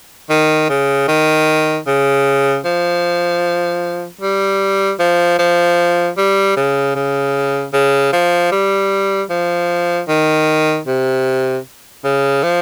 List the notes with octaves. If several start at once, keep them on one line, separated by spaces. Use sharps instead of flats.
D#3
C#3
D#3
C#3
F3
G3
F3
F3
G3
C#3
C#3
C#3
F3
G3
F3
D#3
C3
C#3
F3